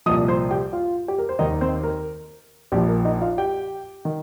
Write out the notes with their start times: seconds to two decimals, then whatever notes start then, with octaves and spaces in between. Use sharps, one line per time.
0.06 C2 A#2 F3 D#5 D#6
0.28 C5 C6
0.51 G4 G5
0.73 F4 F5
1.08 G4
1.18 A#4
1.29 C5
1.39 D#2 D#3 D#4 D#5
1.61 C4 C5
1.83 A#4
2.72 A#1 A#2 F3 G4
2.88 A#4
3.05 D#4 D#5
3.21 F4 F5
3.38 G4 G5
4.05 D#3